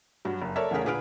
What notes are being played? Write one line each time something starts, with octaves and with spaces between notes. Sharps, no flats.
G2 F#3
F#1
A4 A#4 C#5 D5 E5
A1 E2 C#3 G#4 A#4 B6
A#2 D3 G#4 B4 F6 D7